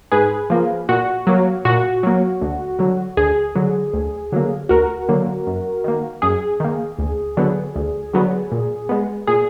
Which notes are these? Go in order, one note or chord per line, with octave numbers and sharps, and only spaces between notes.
G#2 G#4 B4
F3 A#3
A#2 F#4
F#3 A#3
A#2 F#4
F#3 A#3
D2
D3 F#3
D2 G#4
D3 F#3
D2
D3 F#3 A#3
D2 F#4 A#4
D3 F#3 A#3
F#2
D#3 A#3
F#2 G#4
D#3 A#3
D2
D3 F#3 B3
D2
D3 F#3 B3
A#2
G#3 B3
A#2 G#4